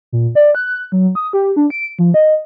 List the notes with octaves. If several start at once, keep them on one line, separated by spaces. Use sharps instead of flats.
A#2
D5
F#6
F#3
D#6
G4
D4
D7
F3
D#5